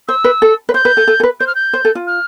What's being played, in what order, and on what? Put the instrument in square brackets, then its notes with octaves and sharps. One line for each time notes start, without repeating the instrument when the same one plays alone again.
[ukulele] C5 [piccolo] E6
[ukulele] B4
A4
B4
[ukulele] C5 [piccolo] G6
[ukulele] B4
A4
A4
A4
B4
[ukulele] C5 [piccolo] G6
[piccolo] F6
G6
[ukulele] C5
A4
F4
[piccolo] F6